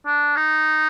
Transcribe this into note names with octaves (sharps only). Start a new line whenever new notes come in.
D4
D#4